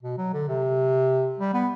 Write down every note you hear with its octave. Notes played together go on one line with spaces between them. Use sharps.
B2
F#3
D3
C3
G3
B3